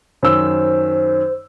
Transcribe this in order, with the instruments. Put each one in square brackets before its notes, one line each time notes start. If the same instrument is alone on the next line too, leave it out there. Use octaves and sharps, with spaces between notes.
[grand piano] F#2 D#3 E6 [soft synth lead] C5